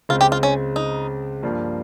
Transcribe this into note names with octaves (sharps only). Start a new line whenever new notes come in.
C#2 C#3 G#3 C4 F4
G4
F4
C#4
D#4
G2 F3 A#3